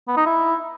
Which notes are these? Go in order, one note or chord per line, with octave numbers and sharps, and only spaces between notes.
B3
D#4
E4